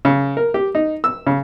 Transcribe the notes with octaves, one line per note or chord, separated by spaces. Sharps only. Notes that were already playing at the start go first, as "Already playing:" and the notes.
C#3
A#4
G4
D#4
E6
C#3